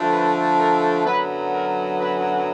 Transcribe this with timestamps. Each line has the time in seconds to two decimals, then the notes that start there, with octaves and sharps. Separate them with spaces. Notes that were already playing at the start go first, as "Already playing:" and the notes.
Already playing: D3 F3 A3
0.11 B4
0.58 A#4
1.05 F#2 D3 F#3 B3 B4
1.52 A#4
2.00 B4